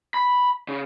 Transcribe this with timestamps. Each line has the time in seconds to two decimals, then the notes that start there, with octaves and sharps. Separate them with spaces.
0.14 B5
0.68 C#3